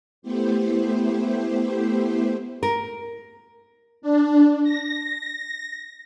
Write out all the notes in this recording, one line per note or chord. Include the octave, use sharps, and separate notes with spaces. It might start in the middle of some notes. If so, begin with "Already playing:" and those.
A3 B3 E4 G4 C5
A#4
D4
A#6